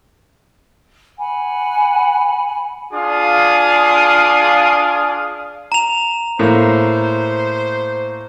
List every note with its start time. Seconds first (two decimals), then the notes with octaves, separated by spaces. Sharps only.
1.18 F#5 G#5 B5
2.93 D4 F4 G#4 F5 D#6
5.72 A#5 F7
6.39 A2 A#3 C5